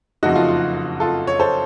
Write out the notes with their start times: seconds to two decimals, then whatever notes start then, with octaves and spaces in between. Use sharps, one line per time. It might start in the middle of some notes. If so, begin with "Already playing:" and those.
0.23 F#1 F2 C#3 F3 A3 D#4 F#4
0.36 F4
0.49 F4
1.00 F4 A4
1.27 C#5
1.39 A4 C5